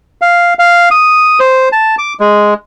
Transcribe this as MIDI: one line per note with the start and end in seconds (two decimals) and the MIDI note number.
0.22 0.54 77
0.59 0.89 77
0.91 1.39 87
1.40 1.69 72
1.72 1.95 81
1.98 2.14 86
2.20 2.54 56